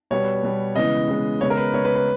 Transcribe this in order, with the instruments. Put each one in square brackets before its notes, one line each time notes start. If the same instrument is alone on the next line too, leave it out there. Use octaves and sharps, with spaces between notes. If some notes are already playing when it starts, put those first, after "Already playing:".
[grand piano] B2 G3 B3 C#5
B2 G3 B3
C#3 E3 G#3 B3 D#5
C#3 E3 G#3 B3
C#3 G#3 B3 C#5
A#4
B4
C#3 G#3 B3 C#5
B4
B4